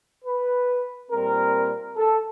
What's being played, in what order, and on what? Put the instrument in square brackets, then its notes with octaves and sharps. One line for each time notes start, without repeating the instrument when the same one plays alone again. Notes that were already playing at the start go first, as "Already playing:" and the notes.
[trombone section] B4
A#2 G3 C4 A#4
A4